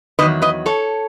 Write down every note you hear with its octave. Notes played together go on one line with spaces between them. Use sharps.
E2 D#3 F#3 B4 D#5
B4 D#5
A4 C#5